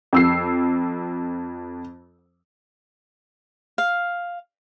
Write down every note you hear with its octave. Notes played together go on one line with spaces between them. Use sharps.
F2 E6 C7
F5